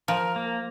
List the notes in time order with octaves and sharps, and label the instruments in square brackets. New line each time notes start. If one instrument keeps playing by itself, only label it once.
[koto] F3 [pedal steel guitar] A#4
[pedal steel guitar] A#3